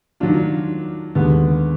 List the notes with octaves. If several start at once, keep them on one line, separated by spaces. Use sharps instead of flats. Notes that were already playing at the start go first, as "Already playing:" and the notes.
D#3 F#3 D4 F4
D#2 D3 G#3 B3